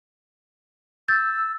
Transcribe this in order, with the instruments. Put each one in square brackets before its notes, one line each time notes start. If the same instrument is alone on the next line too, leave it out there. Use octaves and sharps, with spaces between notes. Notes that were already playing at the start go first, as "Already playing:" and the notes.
[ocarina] E6 [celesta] G6 A6